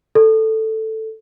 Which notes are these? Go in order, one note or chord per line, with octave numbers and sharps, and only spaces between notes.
A4